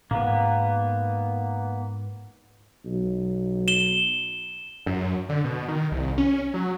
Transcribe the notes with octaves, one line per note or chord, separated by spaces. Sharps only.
G#2 A#3 B3
B1
E7 G7
F#2
D3
B2
D#3
C2
C#4
F#3